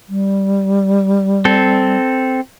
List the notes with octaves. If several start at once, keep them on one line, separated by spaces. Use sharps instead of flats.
G3
C4 A4